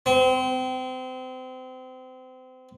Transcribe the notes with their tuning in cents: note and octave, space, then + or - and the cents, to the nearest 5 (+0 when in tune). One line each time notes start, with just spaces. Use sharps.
C4 -30